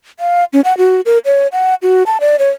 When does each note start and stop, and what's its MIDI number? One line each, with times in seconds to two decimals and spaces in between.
0.20 0.44 77
0.53 0.61 61
0.64 0.77 78
0.78 1.01 66
1.06 1.18 70
1.25 1.47 73
1.52 1.75 78
1.82 2.03 66
2.06 2.18 81
2.20 2.36 74
2.39 2.50 73